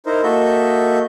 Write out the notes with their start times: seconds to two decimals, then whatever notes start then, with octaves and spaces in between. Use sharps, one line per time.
0.06 D#4 E4 A#4 C5
0.23 A#3 F#4 A4 D#5 E5 G6